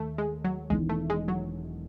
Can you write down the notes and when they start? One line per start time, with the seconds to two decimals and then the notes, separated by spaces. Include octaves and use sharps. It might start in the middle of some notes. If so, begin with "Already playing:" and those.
Already playing: D#2 A3
0.18 G#3
0.45 F#3
0.70 E1 E2 D#3 G#3
0.89 A3
1.10 G#3
1.28 F#3